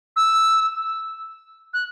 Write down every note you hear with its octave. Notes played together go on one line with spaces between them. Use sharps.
E6
F#6